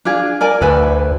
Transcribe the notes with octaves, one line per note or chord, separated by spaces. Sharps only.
D4 F4 G#4
A#4 D5 G#5
D2 A4 B4 G#5